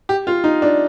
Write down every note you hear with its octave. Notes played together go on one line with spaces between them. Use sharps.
G4
F4
D#4
D4